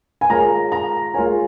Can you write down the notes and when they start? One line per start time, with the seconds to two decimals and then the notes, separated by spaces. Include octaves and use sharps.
0.21 G#5
0.30 G#3 F4 A#4 C#5 A#5
0.72 A#5
1.14 G#3 F4 A#4 C#5 G#5